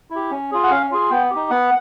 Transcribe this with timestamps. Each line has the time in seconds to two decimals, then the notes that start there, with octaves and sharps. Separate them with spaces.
0.11 E4 G4
0.31 C#4
0.52 F4 G#4
0.64 F#5
0.70 C#4 F5
0.91 F4 G#4
1.11 B3 G5
1.31 D#4 G4
1.50 B3 F#5